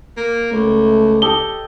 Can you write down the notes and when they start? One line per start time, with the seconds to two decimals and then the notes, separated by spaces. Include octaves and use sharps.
0.17 A#3
0.52 C#2 A3
1.22 G4 A4 D#5 G7